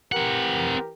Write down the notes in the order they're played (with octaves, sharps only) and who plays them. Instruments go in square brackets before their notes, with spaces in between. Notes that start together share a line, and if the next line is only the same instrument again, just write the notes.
[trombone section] E3 G4 A#4 [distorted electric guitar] C4 F#5